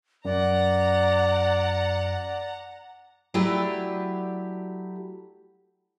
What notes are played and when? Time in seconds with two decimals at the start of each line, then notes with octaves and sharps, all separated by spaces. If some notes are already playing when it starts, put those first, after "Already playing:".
0.25 F#2 D5 F#5 A#5
3.34 F#3 A3 E4 G4 D5